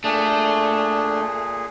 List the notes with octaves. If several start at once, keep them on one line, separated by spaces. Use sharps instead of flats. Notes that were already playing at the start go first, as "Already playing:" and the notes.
A#2 A3 D4 G#4